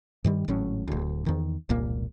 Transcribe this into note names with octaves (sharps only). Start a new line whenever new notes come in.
G2 D#3 G3
G#1 A2 F#3 C#4
D1 D2
E2 D#3
E1 C2 A#2 A#3